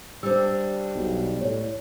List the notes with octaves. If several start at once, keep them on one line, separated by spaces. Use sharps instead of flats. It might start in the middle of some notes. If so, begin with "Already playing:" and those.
G3 D4 C5 E6
B1
A2 C#5